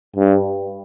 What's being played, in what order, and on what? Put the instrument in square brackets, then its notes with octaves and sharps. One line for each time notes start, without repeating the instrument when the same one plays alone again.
[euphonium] G2